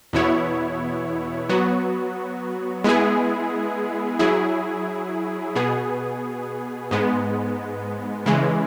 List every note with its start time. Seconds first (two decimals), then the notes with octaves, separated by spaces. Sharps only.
0.13 E2 B2 B3 E4 C#5
1.49 F#3 B3 F#4
2.84 G#3 B3 E4 G#4
4.19 F#3 E4 G#4
5.55 B2 B3 G#4
6.91 G#2 G#3 B3
8.26 C#3 E3 G#3